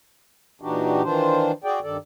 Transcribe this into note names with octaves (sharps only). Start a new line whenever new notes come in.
A#2 E3 D4 D#4 F#4 G4
D#3 E3 D4 F4 C5
F#4 G#4 D5 G5
G2 D#3 A4 D5